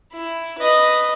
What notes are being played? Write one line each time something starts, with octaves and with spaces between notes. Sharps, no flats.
E4
B4 D#5